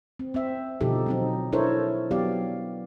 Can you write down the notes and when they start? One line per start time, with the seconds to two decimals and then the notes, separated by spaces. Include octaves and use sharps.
0.19 C4
0.34 C4 E5
0.81 B2 D3 F3 D#4 G4 A4
1.06 F#3 C4 D#4
1.52 D4 E4 A4 A#4 C5 C#5
2.11 F#3 B3 G4 D5 F5